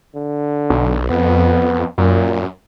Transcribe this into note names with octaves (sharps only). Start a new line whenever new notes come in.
D3
B1
F2 B3
F#2 A#2